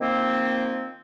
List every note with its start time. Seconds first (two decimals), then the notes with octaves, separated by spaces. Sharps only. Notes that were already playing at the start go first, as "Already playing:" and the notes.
0.01 D#3 F3 A#3 C4